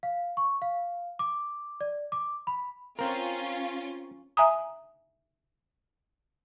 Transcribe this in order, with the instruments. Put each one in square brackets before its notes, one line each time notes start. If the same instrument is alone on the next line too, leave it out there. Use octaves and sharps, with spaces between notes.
[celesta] F5
C#6
F5
D6
D5
D6
B5
[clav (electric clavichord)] C4 A#4 [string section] C#4 F4
[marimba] E5 G#5 A#5 D#6